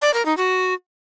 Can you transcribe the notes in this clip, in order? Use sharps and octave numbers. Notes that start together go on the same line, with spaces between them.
D5
A#4
D#4
F#4